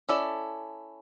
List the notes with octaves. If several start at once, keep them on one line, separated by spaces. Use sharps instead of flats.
C#4 E4 A4 D5